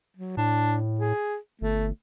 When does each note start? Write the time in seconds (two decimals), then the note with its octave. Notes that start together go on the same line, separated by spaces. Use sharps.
0.17 F#3
0.37 A2 D4
0.99 G#4
1.61 G1 A3